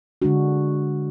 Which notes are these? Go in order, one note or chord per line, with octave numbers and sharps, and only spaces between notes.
D3 G#3 D4 F#4